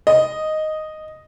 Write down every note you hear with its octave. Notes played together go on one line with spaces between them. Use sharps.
D#5